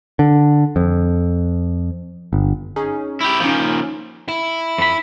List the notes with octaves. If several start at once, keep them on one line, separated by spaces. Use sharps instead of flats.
D3
F2
G1
C#4 D#4 G#4
E4 G4
D#3 F3 A#3 C#4
E4
F2 B5